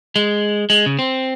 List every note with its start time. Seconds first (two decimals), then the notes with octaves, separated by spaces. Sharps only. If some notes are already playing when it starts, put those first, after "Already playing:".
0.16 G#3
0.70 G#3
0.86 C#3
0.99 C4